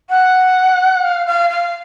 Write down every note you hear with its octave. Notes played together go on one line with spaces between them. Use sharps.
F#5
F5
F5
F5